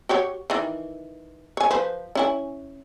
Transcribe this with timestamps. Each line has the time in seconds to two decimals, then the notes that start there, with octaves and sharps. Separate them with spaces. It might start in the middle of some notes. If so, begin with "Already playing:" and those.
0.09 F#4 G4 C#5
0.50 D#3 E3
1.57 C#5 G#5
1.71 F3 B4 C5
2.15 C#4 E4 G#5